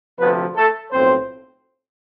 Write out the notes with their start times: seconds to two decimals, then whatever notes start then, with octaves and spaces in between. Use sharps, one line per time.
0.19 D2 C3 F3 B3 B4
0.55 A3 A4
0.91 B1 A2 F3 C4 C5